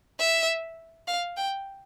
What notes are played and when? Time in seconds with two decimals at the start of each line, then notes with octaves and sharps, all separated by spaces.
0.19 E5
1.08 F5
1.37 G5